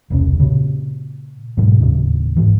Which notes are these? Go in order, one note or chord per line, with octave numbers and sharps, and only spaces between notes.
E1 C2 C#4
A#2 C#3
G#2 B2 F#3 G#3
D#1 A2 C#3
G#2 E3